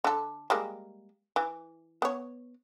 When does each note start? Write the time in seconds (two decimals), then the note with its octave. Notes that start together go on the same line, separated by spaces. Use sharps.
0.04 D3 A4
0.50 G3 G#3 A#3
1.36 E3
2.02 B3 C#5